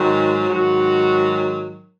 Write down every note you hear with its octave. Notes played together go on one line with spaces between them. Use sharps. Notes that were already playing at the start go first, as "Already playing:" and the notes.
Already playing: G#2 D#3 F#3 F#4
G#2 D#3 F#3 F#4